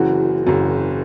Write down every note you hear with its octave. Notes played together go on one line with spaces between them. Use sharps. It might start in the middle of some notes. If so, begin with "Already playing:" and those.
Already playing: F#1 F#2 E3 F#4
F#1 F#2 E3